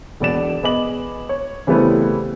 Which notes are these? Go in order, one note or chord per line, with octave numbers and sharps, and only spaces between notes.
E1 B2 D5 E7
B3 G#4 D#5 D6 F#7
C#5
C#3 E3 G3 A3 B3 C4